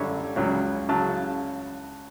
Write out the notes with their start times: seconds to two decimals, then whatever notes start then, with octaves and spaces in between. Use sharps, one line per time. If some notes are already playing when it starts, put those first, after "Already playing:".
Already playing: F#2 D3 G3 C#5
0.36 C#2 C#3 F#3
0.89 C#3 F#3 A5